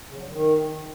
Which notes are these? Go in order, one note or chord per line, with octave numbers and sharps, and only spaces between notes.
C#3
F#3
G2
D#3